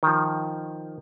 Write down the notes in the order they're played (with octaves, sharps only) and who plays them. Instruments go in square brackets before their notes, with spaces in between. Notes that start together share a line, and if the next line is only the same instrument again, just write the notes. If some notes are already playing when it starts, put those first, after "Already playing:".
[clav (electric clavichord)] D#3 F3